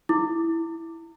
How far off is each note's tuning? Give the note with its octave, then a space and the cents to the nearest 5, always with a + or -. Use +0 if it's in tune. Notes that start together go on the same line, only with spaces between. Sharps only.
E4 +0 D6 +0